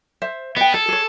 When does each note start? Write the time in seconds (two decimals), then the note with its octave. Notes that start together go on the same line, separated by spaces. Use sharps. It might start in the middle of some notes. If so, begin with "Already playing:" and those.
0.22 C5 E5
0.56 B3 D#5 G5
0.74 G#4 A4
0.88 G#4 C#5